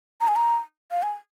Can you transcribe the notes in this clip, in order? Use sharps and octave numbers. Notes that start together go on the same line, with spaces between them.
A#5
G#5
A#5
F5
G#5